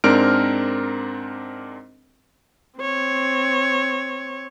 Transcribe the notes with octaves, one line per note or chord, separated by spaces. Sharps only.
G#2 C4 D4 A#4 F6 D7
C4 C#5